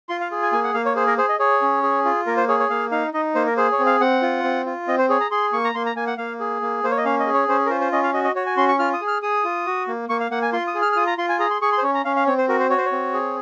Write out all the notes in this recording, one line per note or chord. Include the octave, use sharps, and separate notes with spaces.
F4 C6
F5
G#4
G#5
A#3 G#5
F#5
A#3 F5
C#5
G#4 C5
A#4
G#4 C5
D#5
G#4 C#5
C#4
G#4
F4
A#3 A#4
C5
G#4 C#5
C#5
A#3 F5
D#4 F5
D#4 D#5
A#3 C5
A#4
G#4 C5
C#5
C4
F5
C4 F#5
F4
C4
F4
C4 D#5
C5
G#4 C#5
A#5
G#4 C6
A#3 C#6
A#5
A#3 C6
A#5
A#3 G#5
F#5
A#3 F5
G#4
A#3
A#3 C5
C#5
D#5
C#4 F5
D#5
G#4
C#5
C#4 C5
A#4
F4 C5
C5
C#4 D#5
F5
F#4 D#5
D#5
F#4 C#5
G#5
C#4 C6
C#6
F4 F6
D#6
G#4
F6
G#4 D#6
F4
F#4
A#3
A#3 C#6
F5
A#3 F#5
G#5
F4 C6
D#6
G#4
F6
F6
F4 D#6
A#5
F4 C6
G#5
G#4 A#5
C6
G#4 C#6
C6
C5
C#4 C#5
A#5
C#4 F5
F5
C4 C#5
C5
F#4 A#4
C5
F#4 C#5
C5
C#5
C4
G#4